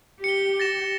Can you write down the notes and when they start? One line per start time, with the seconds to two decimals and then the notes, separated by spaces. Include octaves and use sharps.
0.24 G4 C#7 G7
0.60 A6 A#6 E7